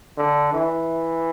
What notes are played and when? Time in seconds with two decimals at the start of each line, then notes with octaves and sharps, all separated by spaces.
0.17 D3
0.53 E3